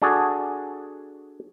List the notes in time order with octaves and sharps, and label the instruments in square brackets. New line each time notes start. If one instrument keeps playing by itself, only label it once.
[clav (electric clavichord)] D4 F#4 G#4 A4